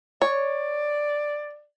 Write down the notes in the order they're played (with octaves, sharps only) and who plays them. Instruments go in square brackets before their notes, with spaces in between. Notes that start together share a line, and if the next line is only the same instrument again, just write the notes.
[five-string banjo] C#5 [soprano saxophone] D5